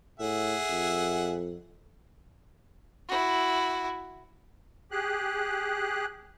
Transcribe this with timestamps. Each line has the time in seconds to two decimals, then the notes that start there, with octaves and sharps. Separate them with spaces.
0.20 A2 G#4 E5 F#5
0.70 F2
3.09 E4 F#4
4.91 G4 G#4 F#6